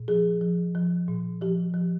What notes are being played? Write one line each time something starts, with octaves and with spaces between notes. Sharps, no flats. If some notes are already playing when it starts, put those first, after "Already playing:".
Already playing: A#2
F3 G#4
F3
F3
A#2
F3 G4
F3